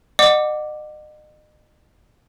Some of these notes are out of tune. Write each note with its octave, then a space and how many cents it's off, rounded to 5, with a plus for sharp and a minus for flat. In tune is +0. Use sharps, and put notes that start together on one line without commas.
D#5 -40 F#5 +0 D6 +0